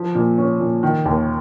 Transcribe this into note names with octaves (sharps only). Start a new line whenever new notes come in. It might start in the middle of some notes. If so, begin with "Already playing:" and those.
Already playing: F3
A#2
C#4
A#2
D#3
D#2